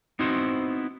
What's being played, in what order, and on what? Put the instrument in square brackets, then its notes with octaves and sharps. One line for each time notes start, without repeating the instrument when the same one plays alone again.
[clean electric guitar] B3 C4 D#4 E4 F#4 C5